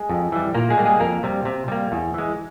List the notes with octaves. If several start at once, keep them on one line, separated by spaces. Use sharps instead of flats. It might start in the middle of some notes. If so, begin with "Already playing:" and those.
Already playing: G#3 G#4
F2
E3 G3
A#2 A#3 A#4
G#3 G#4
G3 A#3
G#3 G#4
F2 A#3 A#4
C3 G3
C3
G3 A#3
E2
E3 G#3